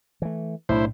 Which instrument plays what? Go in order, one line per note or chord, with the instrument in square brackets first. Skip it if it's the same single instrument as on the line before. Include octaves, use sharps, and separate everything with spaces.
[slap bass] E3 A3
[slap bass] B1 G3 D4 [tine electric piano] A2 [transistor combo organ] E4 C5